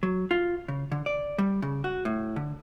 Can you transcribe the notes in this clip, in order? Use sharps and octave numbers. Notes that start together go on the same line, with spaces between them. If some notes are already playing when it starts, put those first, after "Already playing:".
F#3
F4
C#3
D3
D5
G3
C#3
F#4
A2
D3